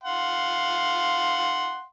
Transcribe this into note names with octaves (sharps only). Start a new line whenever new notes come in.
F5 F#5 C6